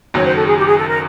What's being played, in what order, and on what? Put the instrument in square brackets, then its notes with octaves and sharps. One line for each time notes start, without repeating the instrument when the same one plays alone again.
[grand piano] F#1 F#2 D#3 F#3 [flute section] C#5
[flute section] C5
A4
G#4
G4
G#4
A4
A#4